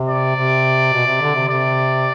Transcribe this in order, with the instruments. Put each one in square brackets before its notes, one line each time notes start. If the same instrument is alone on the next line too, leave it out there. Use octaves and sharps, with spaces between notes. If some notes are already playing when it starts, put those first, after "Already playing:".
Already playing: [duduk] C3
[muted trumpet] D5
[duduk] C3
B2
C3
D3
C3
[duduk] C3 [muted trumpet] D5